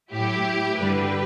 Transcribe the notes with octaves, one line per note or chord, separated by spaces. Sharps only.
A2 F#3 E4 G4
G2 D3 G3 G4 B4